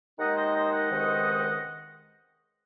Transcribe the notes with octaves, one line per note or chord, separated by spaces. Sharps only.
D#2 D#3 G#3 D#4 D#5 F#5
C5 D#5
C5 D#5
D#5 F#5
C#2 C3 D#3 G#3 D#4